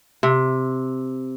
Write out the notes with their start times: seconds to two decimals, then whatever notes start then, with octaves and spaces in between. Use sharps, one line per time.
0.23 C3